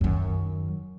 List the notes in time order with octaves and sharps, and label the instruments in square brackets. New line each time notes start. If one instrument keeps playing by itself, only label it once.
[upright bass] F#2 D#3